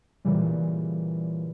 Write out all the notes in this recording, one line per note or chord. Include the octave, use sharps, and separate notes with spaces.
A#2 C#3 E3 G3